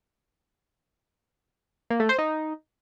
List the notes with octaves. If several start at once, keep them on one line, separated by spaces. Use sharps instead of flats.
A#3
A3
C5
D#4